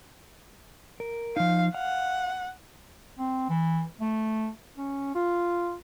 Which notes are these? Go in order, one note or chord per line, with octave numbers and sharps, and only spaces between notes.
A#4
F3 D#4 F5
F5 F#5
C4
E3
A3
C#4
F4